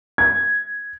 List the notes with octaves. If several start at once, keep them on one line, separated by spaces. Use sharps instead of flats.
G#6